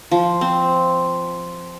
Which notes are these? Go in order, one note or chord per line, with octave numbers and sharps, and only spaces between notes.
F3
C4